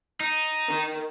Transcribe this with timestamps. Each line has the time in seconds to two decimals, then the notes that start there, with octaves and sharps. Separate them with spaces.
0.20 D#4
0.69 D#3